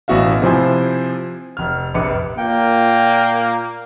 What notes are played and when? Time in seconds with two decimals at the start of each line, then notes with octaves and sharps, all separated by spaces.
0.08 A1 B2 F#4 E5 F5
0.42 C3 F3 E4 C5 G#5
1.57 F1 F6
1.94 F1 A#1 B4 D6 C#7
2.38 A#2 A#3 G5